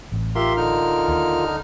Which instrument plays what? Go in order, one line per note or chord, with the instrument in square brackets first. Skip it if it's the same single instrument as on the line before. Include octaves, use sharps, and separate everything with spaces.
[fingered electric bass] A1
[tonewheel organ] F4 A#4 [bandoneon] G4 E5 C6
[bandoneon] D3 D#4 F6
[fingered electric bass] D#2